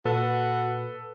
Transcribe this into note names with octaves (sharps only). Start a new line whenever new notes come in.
A#2 F#4 A4 B4